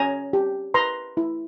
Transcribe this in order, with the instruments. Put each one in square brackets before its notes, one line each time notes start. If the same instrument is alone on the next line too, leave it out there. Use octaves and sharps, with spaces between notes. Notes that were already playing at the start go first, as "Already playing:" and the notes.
Already playing: [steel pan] C#4 G#5 A#5
G4
B4 A#5 C6
E4